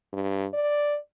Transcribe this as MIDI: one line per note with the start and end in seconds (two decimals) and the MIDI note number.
0.13 0.46 43
0.54 0.98 74